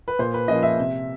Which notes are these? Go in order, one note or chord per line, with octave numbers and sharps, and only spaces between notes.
B4
A#2 C5
B4
F3 A#3 C#4 D#5
E5
C3